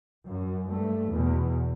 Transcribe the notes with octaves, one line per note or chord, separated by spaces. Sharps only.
F#2
G2 A3
E2 B2